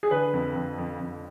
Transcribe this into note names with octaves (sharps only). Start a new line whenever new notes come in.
G#4
D3 B4
F2
F2
F2
F2